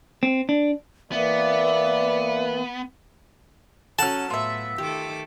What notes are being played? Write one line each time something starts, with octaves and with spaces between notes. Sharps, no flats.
C4
D4
E3 A#3 B3 D5 E5
F#3 C#4 A4 F#5 A5 F6
A2 B3 F4 E5
D#3 A3 G4 D6